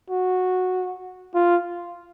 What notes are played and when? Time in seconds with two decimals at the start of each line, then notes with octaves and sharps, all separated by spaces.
0.10 F#4
1.35 F4